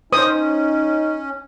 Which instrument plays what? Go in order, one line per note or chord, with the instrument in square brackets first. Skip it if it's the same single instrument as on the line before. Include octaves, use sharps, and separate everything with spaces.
[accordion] C#4 [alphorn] D#4 [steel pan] C5 D#6